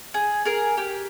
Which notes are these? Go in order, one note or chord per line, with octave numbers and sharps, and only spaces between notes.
G#4
G#4 A#4
G4